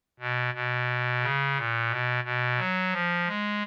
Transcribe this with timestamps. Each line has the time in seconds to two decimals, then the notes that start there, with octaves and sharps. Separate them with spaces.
0.20 B2
0.54 B2
1.22 C#3
1.56 A#2
1.90 B2
2.24 B2
2.58 F#3
2.92 F3
3.27 G#3